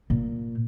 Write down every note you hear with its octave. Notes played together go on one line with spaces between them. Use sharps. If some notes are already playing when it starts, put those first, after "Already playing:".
A#2